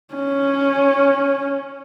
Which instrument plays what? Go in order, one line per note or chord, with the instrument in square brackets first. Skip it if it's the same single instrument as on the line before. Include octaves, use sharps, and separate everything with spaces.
[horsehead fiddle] C#4